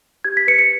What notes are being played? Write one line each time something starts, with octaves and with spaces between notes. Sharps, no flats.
G4 G#6
B6
B4 C#7
C#7